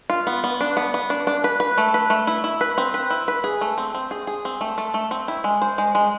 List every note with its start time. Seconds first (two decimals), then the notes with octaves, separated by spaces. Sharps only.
0.10 F4
0.27 B3
0.44 B3
0.61 D4
0.77 B3
0.94 B3
1.10 D4
1.27 D4
1.44 B4
1.60 B4
1.78 A3
1.94 B4
2.10 A3
2.27 E4
2.44 E4
2.61 B4
2.78 C4
2.94 B4
3.10 E4
3.28 B4
3.44 G#4
3.61 A3
3.78 C4
3.95 C4
4.11 G#4
4.27 G#4
4.45 C4
4.61 A3
4.78 A3
4.94 A3
5.11 C4
5.28 E4
5.44 G#3
5.62 C5
5.78 G#3
5.95 G#3